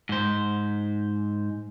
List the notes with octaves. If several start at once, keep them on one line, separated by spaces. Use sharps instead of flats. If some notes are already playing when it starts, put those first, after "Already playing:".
G#2 C5